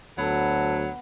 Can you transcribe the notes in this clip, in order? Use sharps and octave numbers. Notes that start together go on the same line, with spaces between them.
D2 F#3 B3 A4